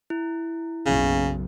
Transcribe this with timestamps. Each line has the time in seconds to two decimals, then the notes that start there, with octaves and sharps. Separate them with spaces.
0.10 E4
0.86 F#1 B1 F#2 C#3